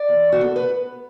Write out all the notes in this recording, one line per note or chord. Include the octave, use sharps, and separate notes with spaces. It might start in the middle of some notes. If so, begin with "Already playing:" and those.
Already playing: D5
E2
F#4
B3 A4
B4